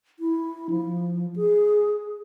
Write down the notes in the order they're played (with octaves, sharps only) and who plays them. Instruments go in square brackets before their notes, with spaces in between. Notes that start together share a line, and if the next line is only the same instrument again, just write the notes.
[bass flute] E4
F3
G#4